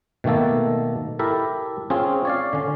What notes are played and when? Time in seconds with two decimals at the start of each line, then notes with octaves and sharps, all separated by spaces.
0.24 B2 D#3 A3 A#3 A4
1.19 E4 G4 A4 A#4 E5
1.90 C4 C#4 F4 G#4
2.25 C#5 D5 F5
2.53 D3 C#4